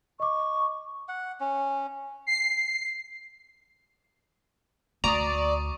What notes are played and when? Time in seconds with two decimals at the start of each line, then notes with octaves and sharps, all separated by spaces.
0.20 D#5 C#6 D6
1.08 F#5
1.40 C#4
2.27 C7
5.04 D2 D5 A#5 C#6 D#6